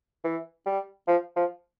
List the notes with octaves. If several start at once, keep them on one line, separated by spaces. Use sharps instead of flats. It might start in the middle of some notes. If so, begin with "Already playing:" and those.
E3
G3
F3
F3